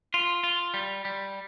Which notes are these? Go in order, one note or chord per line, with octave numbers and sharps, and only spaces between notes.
F4
F4
G3
G3